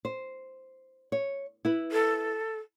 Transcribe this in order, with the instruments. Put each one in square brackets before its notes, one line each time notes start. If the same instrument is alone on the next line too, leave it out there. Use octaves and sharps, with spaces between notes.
[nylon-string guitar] C5
C#5
E4 B4
[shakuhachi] A4